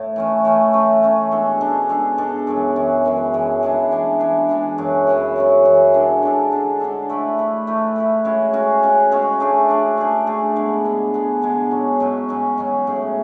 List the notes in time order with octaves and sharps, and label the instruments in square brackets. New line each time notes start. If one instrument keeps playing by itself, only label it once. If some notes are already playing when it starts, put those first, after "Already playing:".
Already playing: [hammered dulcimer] A2
E3 A3 C#4
E3 A3 C#4
E3 A3 C#4
E3 A3 C#4
B2 G#3 D4 A4
B2 G#3 D4 A4
B2 G#3 D4 A4
B2 G#3 D4 A4
F#2 E3 G#3
F#2 E3 G#3
F#2 E3 G#3
F#2 E3 G#3
E3 G#3 D4
E3 G#3 D4
E3 G#3 D4
E3 G#3 D4
F#2 C#3 E3
F#2 C#3 E3
F#2 C#3 E3
F#2 C#3 E3
D3 G#3 D4 A4
D3 G#3 D4 A4
D3 G#3 D4 A4
D3 G#3 D4 A4
A3 E4 B4
A3 E4 B4
A3 E4 B4
A3 E4 B4
C#3 G#3 C#4 F#4
C#3 G#3 C#4 F#4
C#3 G#3 C#4 F#4
C#3 G#3 C#4 F#4
A3 D4 G#4 D5
A3 D4 G#4 D5
A3 D4 G#4 D5
A3 D4 G#4 D5
D3 G#3 B3
D3 G#3 B3
D3 G#3 B3
D3 G#3 B3
G#2 F#3 C#4
G#2 F#3 C#4
G#2 F#3 C#4
G#2 F#3 C#4
A2 G#3 C#4 G#4